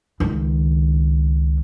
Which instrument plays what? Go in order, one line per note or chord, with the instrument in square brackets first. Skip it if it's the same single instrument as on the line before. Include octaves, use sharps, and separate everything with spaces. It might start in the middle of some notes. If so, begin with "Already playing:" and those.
[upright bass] C#2 D#3